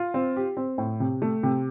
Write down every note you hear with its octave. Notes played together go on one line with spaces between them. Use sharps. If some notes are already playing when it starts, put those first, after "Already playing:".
Already playing: F4
C4
G4
C4
A2
C3
A3
C3